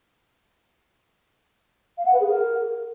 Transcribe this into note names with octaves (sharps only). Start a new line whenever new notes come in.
F5
F#5
B4
G#4
A#4